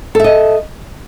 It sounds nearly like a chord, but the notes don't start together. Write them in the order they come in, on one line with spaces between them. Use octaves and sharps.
A4 E5 D#5